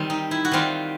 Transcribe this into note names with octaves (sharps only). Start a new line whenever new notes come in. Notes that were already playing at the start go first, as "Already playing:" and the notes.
Already playing: D#3 G3 C4
D#4
E4
F#4
D#3 G3 C4 F4